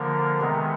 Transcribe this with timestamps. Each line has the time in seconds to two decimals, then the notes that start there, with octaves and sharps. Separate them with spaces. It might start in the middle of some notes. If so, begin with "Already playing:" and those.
Already playing: D3 F3 A#3 A#4
0.40 C3 D#3 G#3 B3